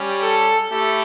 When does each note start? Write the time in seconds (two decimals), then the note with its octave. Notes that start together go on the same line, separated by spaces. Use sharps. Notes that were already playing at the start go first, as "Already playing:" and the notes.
Already playing: G3 C#4 G4
0.21 A4
0.71 A3 E4 G4 A4